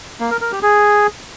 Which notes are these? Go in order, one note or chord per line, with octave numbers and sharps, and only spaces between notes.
A#3
A#4
A#4
G4
G#4